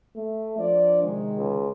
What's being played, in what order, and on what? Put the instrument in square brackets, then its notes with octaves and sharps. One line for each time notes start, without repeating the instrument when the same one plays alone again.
[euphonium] A3
[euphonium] F3 [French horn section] D4 D5
[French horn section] C3 D#3 G#3
[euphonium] C#2